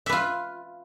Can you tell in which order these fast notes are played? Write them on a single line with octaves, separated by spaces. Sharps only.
E5 B4 F4